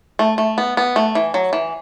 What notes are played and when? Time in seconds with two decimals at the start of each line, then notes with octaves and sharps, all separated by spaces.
0.19 A3
0.38 A3
0.58 B3
0.77 B3
0.96 A3
1.15 E3
1.34 F#3
1.53 E3